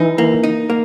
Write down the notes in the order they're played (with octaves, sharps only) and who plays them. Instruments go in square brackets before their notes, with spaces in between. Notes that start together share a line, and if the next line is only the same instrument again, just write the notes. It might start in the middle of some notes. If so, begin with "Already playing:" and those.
Already playing: [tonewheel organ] E3 [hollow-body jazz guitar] D#4
[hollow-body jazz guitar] A#3
D#4
A#3